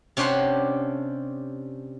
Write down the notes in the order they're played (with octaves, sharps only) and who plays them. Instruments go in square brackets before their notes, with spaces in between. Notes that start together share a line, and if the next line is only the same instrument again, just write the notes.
[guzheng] C3 C#4 D4 G4 C5 F#5